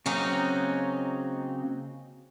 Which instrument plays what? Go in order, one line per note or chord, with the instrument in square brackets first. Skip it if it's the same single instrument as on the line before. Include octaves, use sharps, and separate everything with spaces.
[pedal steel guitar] C#3 A#3 C4 [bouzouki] F#3 C#4 D#4